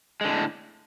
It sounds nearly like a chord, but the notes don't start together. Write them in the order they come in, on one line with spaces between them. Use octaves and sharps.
G#3 D3 A2